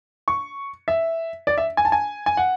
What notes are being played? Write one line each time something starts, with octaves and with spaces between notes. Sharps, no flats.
C#6
E5
D5
E5
G#5
A5
G#5
G#5
F#5